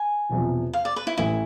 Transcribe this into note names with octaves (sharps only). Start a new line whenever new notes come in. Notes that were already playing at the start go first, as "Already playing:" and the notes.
Already playing: G#5
E1 E2 C3 F3
F5
D5
B4
E4
A1 A2 E3 A3 E4